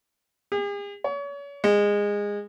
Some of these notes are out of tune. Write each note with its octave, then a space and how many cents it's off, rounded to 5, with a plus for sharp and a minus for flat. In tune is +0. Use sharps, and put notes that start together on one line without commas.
G#4 -45
C#5 +35
G#3 -20